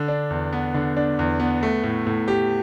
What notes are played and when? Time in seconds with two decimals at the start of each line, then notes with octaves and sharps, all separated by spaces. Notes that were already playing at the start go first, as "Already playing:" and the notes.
Already playing: D3
0.08 D4
0.30 E2
0.53 B3
0.74 D3
0.97 D4
1.19 E2
1.40 B3
1.63 A3
1.84 A2
2.07 A2
2.28 G4